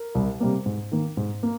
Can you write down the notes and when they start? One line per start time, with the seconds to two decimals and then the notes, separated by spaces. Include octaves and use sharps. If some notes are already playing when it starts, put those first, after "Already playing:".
Already playing: A#4
0.15 C2
0.40 C3 G3 A#3
0.66 G#2
0.92 D#3 A#3
1.17 G#2
1.43 A#3